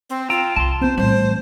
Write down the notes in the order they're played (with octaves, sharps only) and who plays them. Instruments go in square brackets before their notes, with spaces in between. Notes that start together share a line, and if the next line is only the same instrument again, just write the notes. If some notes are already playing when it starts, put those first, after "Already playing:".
[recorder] C4
[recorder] F4 [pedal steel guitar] G5 A#5 E6
[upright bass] C2 [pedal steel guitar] A5 C6
[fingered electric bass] B3 C4 [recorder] C5
[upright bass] A2 E3 [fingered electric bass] G3 [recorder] C5